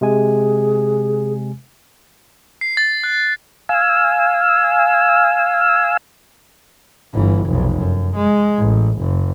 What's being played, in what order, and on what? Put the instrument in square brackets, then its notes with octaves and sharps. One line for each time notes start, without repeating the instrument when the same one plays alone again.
[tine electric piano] C3 G#3 G#5 [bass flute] G#4
[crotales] C7
A6
F#6
[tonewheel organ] F5 G#5 E6
[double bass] G1 E3
F1 B1
F#2
G#3
A1
F#1